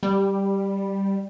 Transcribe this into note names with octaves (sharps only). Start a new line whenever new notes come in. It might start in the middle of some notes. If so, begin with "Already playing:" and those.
G3